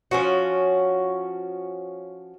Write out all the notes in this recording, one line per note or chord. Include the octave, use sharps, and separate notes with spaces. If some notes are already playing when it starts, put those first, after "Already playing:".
F3 C#4 F#4